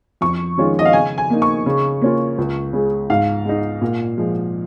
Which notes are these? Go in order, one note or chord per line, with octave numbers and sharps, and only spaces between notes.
F2 C#6
D#3 G#3 C#4 F4
D#5
F5
C#3 G#5
G#5
A#3 D#4
C#6
C#3
A#3 C#4 F4
C#2
C#3 G#3
G#2 F5
G#3 D#4
A#2
F3 G#3